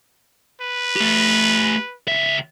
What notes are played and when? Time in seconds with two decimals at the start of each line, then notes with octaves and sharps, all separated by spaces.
0.62 B4
0.96 A3 G4
2.08 C#2 E5